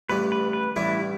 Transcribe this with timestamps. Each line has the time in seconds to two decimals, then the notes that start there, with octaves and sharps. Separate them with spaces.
0.09 A1 G2 G3 B4
0.32 B4
0.53 B4
0.76 A1 G2 G3 D4 E4